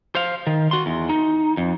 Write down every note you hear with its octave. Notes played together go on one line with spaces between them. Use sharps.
C5 F5
D#3
F#4 C6
E2
D#4
F2